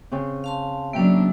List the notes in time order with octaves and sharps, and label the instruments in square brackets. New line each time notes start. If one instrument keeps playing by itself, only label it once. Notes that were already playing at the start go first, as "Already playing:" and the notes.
[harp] C#3 C4
[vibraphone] F5 A5 C6
[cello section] B2 F#3 D4 [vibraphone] A#3 C#4 [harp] E5 G5